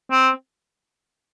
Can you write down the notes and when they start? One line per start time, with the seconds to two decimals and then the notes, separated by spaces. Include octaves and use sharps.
0.11 C4